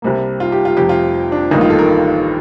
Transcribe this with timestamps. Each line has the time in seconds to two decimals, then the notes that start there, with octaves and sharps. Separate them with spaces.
0.02 C2 C3 G3 A#3
0.40 F4
0.52 G4
0.65 F4
0.77 F1 F2 C3 G4
0.89 F4
1.32 D4
1.51 A1 G2 D#3 A#3 D#4
1.61 F4
1.70 A4
1.78 A#4